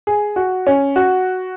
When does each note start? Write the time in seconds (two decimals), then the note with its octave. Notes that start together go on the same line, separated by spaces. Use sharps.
0.07 G#4
0.36 F#4
0.67 C#4
0.96 F#4